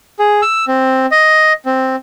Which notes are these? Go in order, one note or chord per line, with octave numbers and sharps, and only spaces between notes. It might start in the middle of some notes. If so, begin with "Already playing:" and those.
G#4
E6
C4
D#5
C4